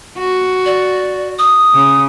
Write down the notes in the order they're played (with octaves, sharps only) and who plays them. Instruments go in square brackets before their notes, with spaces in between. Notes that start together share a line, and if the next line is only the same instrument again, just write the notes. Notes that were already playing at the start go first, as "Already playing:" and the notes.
[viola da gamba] F#4
[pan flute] D5
D#6
[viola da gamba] C#3